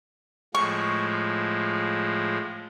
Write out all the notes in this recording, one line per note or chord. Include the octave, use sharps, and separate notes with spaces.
A2 F3 G#3 C#6